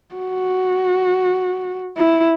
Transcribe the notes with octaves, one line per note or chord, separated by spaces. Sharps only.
F#4
E4